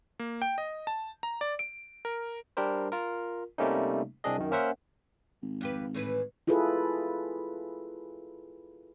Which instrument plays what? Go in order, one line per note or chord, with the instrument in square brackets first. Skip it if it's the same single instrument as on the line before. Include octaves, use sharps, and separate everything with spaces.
[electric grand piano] A#3
G5
D#5
A5
A#5
D5
D7
A#4
[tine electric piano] G3 D4 G4 A#4 C5
F4 A#4
C3 G3 A3 A#3 C#4 D#4
C2 C4 D4 G#4 D#5
F#2 D#3
A#3 C#4 A#4 C5 E5 F#5
[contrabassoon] G#1
[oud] F2 G4 B4
A2 E3 B4
[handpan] E4 F4 G#4 A4 B4